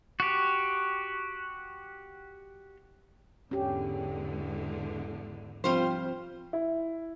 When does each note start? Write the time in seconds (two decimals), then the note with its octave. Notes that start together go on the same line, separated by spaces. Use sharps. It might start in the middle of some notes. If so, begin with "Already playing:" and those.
0.20 F#4 G4
3.51 E2 G#2 D3 C#4 G4
5.64 F3 G3 C4 F4 C5
6.53 E4